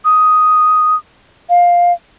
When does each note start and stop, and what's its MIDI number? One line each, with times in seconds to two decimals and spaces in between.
0.05 0.95 87
1.49 1.92 77